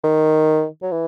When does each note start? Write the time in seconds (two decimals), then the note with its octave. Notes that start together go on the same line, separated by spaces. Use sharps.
0.04 D#3
0.82 F#3
0.92 E3